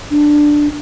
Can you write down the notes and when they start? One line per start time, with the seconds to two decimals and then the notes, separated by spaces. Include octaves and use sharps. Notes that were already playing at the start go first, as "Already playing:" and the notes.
0.10 D4